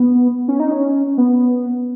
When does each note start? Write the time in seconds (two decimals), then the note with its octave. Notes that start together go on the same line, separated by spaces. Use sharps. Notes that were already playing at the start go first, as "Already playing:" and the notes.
Already playing: B3
0.48 C#4
0.60 D#4
0.71 C#4
1.18 B3